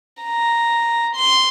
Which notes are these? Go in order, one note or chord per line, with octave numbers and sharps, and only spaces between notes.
A#5
C6